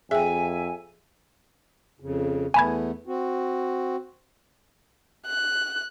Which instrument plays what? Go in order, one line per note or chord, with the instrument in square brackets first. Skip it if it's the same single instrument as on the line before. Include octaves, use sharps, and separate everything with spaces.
[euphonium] F2 [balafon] G#4 G5 [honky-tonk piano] E5 [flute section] G#5
[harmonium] F2 C#3
[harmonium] E2 A3 B3 [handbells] G#5 B5 G#6
[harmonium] C4 F#4
[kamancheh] F#6